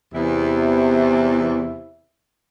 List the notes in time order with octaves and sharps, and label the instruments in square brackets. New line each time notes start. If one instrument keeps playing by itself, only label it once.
[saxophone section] E2 [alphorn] C3 [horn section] E4